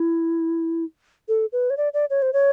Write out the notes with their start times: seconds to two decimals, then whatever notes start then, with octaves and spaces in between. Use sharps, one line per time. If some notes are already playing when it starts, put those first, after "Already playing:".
Already playing: E4
1.29 A4
1.52 B4
1.70 C#5
1.77 D5
1.94 D5
2.10 C#5
2.22 C5
2.33 C#5